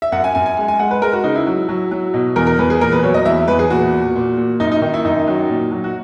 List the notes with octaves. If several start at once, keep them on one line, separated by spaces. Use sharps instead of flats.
E5
F#2 F#5
G#5
F#2 G#5
G#5
G#3 G#5
G#5
G#3 F#5
B4
G#3 A#4
F#4
C#3 D#4
E4
F#3
F#3
F#3
B2
E2 A#4
A#4
E2 B4
G#4
A#2 A#4
B4
F#3 C#5
D#5
E2 E5
E2 B4
G#4
A#2 F#4
A#2
A#2
A#2
F#2 D#4
D#4
D#3 D#4
E4
F#2 D#4
F#3
A#2
F#3
F#4